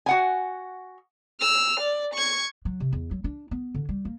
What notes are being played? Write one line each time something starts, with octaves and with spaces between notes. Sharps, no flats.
F#4 F#5 G#5
E6 F6
D5
C#6 G#6
F#3
C3
E2
F#3
D4
B3
D3
G3
A#3